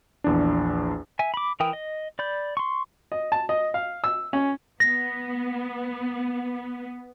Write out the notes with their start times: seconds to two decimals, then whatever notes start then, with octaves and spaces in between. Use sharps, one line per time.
0.24 A#1 E2 D4
1.19 E5 G#5
1.34 B5 D6
1.60 E3 E4 A#4 G5 D#6
1.73 D#5
2.19 D5 B5 G6
2.57 C6 C#6
3.12 D#5
3.32 A5
3.49 D#5
3.74 F5
4.04 E6
4.33 C#4
4.80 B3 A#6